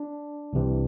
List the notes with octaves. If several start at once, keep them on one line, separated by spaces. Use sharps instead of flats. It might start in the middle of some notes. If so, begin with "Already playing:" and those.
Already playing: D4
C2 C3 E3